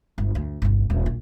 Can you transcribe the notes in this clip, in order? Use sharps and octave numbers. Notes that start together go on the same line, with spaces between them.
G1
D2
G1 C2
D#1
A#1